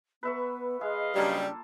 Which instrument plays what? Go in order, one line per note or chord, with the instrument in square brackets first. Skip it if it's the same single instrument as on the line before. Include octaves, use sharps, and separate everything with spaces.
[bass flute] B3 [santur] B4 E5 C#6
[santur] G#3 [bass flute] G#4 [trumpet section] B4 D#5 F5
[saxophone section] C#3 F#3 G3 [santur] A#3 F4 A4 [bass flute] D4